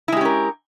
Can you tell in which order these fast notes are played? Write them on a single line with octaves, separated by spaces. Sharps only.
E4 G#3 G4 C#4 A#4